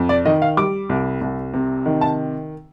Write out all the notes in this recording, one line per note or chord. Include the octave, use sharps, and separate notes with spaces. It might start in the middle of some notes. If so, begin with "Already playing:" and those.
Already playing: F2
D5
D#3 D#5
F5
G3 D6
C2
C2
C3
D#3
A5